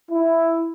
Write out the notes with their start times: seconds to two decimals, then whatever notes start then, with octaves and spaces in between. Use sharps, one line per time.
0.11 E4